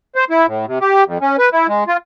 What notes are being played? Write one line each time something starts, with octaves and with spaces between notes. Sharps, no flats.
C5
E4
A2
C3
G4
F2
C#4
B4
E4
G#3
F4